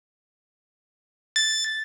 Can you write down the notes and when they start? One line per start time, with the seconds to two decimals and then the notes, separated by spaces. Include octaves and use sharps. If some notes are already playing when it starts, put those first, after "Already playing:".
1.36 A6